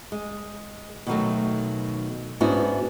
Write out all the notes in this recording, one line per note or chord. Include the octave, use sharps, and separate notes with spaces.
G#3
B2 D#3 F#3 A3
G#2 B3 C#4 D4 E4 F#4